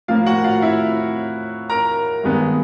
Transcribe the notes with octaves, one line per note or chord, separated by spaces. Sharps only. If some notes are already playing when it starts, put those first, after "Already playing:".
A2 F3 A#3 F4 F5
F#4 F#5
F4 F5
E4 E5
A#4 A#5
G2 D#3 G#3 B3